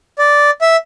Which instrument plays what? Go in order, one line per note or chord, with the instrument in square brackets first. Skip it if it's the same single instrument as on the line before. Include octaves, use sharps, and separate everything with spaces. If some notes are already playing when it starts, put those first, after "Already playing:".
[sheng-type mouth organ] D5
E5